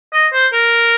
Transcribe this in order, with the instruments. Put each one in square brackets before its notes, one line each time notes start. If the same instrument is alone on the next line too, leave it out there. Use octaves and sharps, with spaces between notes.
[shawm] D#5
C5
A#4